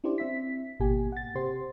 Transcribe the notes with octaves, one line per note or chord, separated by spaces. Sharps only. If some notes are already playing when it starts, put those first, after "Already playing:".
C#4 D4 E4 G4 C5 D5
C4 E5 B6
G#1 B2 A#3 G4 G#5
F#5 A6
C3 G4 C5 C6